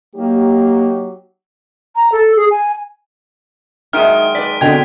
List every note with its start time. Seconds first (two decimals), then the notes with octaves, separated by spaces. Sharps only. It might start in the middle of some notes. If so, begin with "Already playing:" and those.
0.15 F#3 A#3 D#4 G4
1.96 A#5
2.12 A4
2.36 G#4
2.51 G#5
3.93 D#3 F#3 G#3 D#4 E5 F6 D7 D#7
4.35 B4 D5 B6
4.61 B2 D3 C4 D#5 G5 G#6 B6 F7